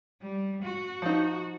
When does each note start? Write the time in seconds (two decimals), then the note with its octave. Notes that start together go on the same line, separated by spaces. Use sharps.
0.22 G3
0.63 F#4
1.02 F3 D#4